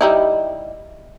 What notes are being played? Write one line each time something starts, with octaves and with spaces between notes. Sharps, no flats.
G3 D#4 E4